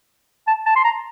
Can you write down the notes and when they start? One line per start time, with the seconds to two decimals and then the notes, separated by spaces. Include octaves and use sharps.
0.47 A5
0.66 A5
0.76 C6
0.84 A#5